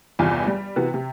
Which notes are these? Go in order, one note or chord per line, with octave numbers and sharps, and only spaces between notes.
G1 E2 C3 F4
G3
C3 E3 B3 F#4
C3